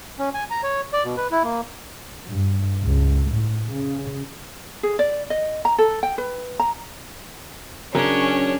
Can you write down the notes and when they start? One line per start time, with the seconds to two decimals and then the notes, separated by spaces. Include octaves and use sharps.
0.18 C#4
0.34 G#5
0.51 A#5
0.63 C#5
0.93 D5
1.05 B2
1.17 B4
1.31 E4
1.43 A#3
2.27 G2
2.85 C#2
3.29 A2
3.72 C#3
4.83 G#4
4.99 D5
5.30 D#5
5.65 A#5
5.78 A4
6.03 G5
6.18 B4
6.60 A#5
7.95 C#3 F#3 C#4 D4 A#4 C#5